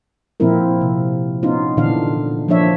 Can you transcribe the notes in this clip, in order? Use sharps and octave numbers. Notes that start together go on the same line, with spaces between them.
A#2 F3 A#3 C4 E4 A#4
C3
B3 C#4 D#4 F4
A#2 D3 E3 D4 F5
F3 A#3 D4 C#5 E5